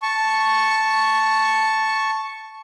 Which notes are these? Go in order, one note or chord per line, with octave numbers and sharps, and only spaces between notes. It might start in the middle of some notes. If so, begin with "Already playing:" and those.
A5 C#6